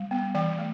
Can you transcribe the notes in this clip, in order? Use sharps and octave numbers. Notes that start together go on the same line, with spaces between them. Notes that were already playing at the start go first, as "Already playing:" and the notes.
Already playing: G3
B3
E3 G5
A3